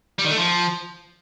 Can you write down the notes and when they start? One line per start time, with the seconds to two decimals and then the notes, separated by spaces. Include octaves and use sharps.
0.19 G3
0.25 D#3
0.31 A3
0.37 F3